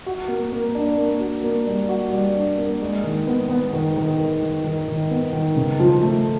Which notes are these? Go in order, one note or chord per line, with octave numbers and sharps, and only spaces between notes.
F#4
A#3
A#3
D4
A#3
F#4
A#3
G3
F#4
G3
D4
A#3
G#3
D#3
B3
B3
D#3
D#3
D#3
D#3
D#3
D#3
B3
D#3
C#3
F3
A3